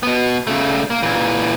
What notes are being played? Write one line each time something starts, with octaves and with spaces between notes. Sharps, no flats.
B2 B3
C#3 A3
A#3
A#2 E3